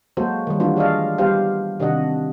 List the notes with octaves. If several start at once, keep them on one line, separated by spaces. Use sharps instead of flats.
F#3 G#3 A#3 F#4 A4 C5
D#3 G3
E3 A3 D4 F4 F#4
G#4 D5 D#5 F5
G3 B3 G4 C5 F5
C3 D#3 D4 F#4 D#5 F#5